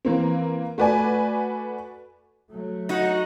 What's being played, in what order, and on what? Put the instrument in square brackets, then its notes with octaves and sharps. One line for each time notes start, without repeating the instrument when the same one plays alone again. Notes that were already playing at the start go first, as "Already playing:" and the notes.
[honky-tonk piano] E3 A#3 C4
A3 F#4 B4 D5 G#5
[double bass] F#3 A3
[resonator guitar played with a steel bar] D#4 [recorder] F#4